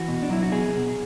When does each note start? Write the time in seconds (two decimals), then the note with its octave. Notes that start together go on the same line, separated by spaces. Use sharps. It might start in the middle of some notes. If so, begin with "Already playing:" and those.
Already playing: E3 F#4
0.08 B2
0.22 D4
0.30 F#3 E4
0.42 F#4
0.52 B2 G#4
0.74 B2